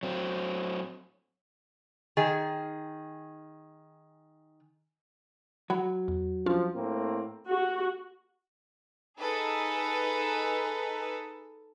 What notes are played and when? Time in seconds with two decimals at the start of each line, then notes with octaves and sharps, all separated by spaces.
0.03 F#3 C4
2.17 D#3 G#4
5.70 F#3 F#5 B5
6.08 E2
6.46 F3 C#4 D4 F4
6.76 A2 A#3 C4
7.49 F#4
9.18 D#4 G#4 A4 B4